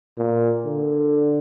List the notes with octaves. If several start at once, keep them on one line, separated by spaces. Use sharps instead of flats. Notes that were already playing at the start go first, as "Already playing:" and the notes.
A#2
D3